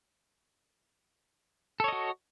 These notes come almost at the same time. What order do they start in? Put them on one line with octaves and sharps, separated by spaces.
A4 C#5 D#5 F#4